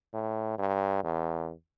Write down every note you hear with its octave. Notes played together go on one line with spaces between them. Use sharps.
A2
G2
E2